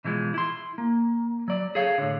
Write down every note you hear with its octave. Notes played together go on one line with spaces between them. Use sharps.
B2 E3 F3 G#3
E4 C6
A#3
F#3 D5
G#4 A4 C#5 F5
A2 D3